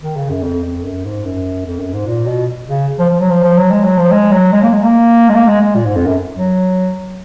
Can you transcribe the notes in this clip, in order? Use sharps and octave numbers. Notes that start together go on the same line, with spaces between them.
D#3
C#3
F#2
F2
F2
F#2
G#2
F#2
F2
F#2
G#2
A#2
B2
C#3
F3
F3
F#3
F3
F3
F#3
G#3
F#3
F3
G#3
F#3
G#3
A#3
G#3
A#3
G#3
A#3
G#3
G#3
A#2
G#2
F2
F#2
F#3